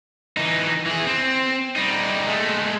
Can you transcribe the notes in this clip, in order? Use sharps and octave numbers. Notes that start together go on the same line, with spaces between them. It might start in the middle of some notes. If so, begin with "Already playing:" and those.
E3 D#4
E3 G#4
C4
G3 D#4
G#3 A3